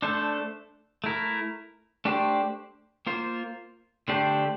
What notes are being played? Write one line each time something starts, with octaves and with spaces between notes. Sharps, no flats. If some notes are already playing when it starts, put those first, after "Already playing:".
A3 D4 A4 C5
A3 E4 A#4
A3 D4 G4 C5
A#3 F4 C5
D3 A3 D4 G4 C5